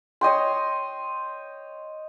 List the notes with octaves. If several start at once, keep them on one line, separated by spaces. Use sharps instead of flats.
C#5 D#5 G5 C6